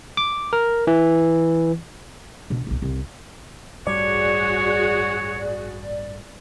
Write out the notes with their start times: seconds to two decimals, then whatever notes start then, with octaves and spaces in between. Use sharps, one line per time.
0.17 D6
0.53 A#4
0.87 E3
2.50 B2 D4
2.67 D1 B1
2.82 C2
3.87 A1 G2 G3 F#4 G#4 C#5 D5